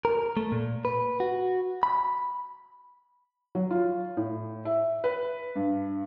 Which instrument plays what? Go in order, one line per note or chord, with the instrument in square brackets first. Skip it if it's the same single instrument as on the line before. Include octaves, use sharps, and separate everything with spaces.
[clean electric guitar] A#4
A3
A#2
B4
F#4
B5
[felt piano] F#3
F4
A2
E5
B4
G2